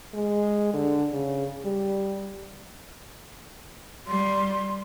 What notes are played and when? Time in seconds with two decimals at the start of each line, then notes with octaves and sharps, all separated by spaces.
0.14 G#3
0.74 D3
1.13 C#3
1.64 G3
4.07 G3 C6